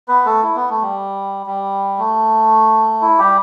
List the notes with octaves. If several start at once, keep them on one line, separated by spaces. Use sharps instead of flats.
B3 B4
A3 A4
E4
B3
A3
G3
G3
A3
E4
G3 G4